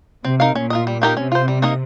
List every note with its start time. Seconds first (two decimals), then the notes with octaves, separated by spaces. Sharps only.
0.25 C3 C4
0.40 D#4 A#4 F5
0.55 A#2 C#4
0.70 F4 A#4 D#5
0.87 G3
1.02 A#3 D#4 G4 A#4
1.17 C3 C#4
1.32 F4 C5
1.48 G3
1.62 A#3 D#4 A#4 D#5